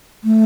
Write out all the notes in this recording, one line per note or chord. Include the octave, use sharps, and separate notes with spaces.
A3